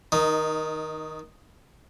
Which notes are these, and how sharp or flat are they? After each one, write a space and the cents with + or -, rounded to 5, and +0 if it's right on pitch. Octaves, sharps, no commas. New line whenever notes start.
D#3 +15 D#4 -10